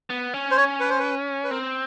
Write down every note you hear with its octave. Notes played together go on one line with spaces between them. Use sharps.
B3
C#4
C5
C#5
B4
C5
B4
B4
C4 A#4